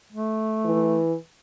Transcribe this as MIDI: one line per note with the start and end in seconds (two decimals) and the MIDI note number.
0.12 1.01 57
0.65 1.15 52